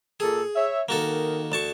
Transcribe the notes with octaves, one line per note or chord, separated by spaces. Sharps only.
A#2 G#4 A4
C#5 E5
D#3 A#3 F#4 A4
D2 A5 C#6